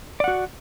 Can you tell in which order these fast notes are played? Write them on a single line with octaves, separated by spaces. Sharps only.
D5 F#5 F#4